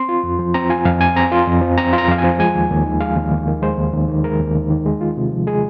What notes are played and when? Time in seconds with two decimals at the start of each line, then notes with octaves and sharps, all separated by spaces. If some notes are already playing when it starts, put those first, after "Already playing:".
Already playing: C4 C6
0.09 F4
0.23 F2
0.39 F3
0.54 C4 A#5
0.70 F4 G#5
0.85 F2 F5
1.01 F3 G#5
1.16 C4 A#5
1.32 F4
1.47 F2
1.62 F3
1.78 C4 A#5
1.93 F4
1.98 A#5
2.08 F2 F5
2.18 G#5
2.24 F3
2.39 G#3 G#5
2.55 D#2
2.70 D#2
2.86 D#3
3.00 G#3 F5
3.17 D#2
3.31 D#2
3.48 D#3
3.62 G#3 C5
3.78 D#2
3.93 D#2
4.08 D#3
4.24 G#3 A#4
4.40 D#2
4.55 D#2
4.70 D#3
4.86 G#3
5.01 F4
5.17 C3
5.32 F3
5.47 G#3 G#4